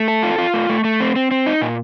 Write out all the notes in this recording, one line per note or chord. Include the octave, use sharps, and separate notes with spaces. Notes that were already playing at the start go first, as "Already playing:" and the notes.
Already playing: A3
A4
F4
F4
A3
A3
A3
C4
C4
C4
D#4
A#2